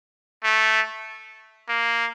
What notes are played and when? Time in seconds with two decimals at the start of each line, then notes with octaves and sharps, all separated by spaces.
0.44 A3
1.69 A#3